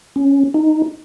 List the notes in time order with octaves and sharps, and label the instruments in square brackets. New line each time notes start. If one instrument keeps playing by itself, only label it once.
[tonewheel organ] C#4
D#4